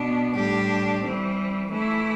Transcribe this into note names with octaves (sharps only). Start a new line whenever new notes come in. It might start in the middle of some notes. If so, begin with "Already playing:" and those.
Already playing: B2 B3 D4
A2 G3 D4 G4
E3 G3 C4
E3 A3 E4